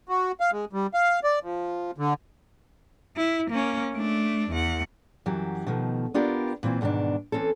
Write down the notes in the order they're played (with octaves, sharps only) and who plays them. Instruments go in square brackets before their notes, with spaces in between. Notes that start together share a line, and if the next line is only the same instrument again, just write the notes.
[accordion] F#4
F5
G#3
G3
F5
D5
F3
D3
[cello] E4
A#3 C#4
A3 D4
E2 F#5
[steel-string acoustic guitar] F#2 E3 F#3 G4
B2 D#3 F3 A3
B3 D4 F4 G4 A#4
A#2 E3 C4 F4
E2 G#2 B2 D#3 D4
E3 C4 C#4 A4